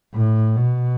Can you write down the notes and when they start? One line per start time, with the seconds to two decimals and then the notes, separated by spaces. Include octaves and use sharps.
0.14 A2
0.56 B2